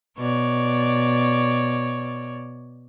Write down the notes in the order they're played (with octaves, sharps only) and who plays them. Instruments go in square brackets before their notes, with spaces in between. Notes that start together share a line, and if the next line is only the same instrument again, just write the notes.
[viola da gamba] B2 C#5 D5